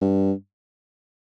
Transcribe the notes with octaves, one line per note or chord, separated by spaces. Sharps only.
G2